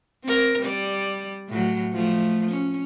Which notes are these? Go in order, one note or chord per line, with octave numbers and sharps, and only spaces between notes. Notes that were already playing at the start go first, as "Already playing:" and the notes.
C4 A#4
G3 D5
A2 F#3
F3 A3
C#4